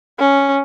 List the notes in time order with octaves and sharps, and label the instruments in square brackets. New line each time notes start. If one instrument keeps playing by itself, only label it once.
[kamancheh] C#4